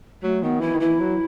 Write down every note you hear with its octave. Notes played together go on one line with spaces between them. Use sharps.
F#3 A3
D#3 B3
E3 E4
D#3
E3 E4
F#3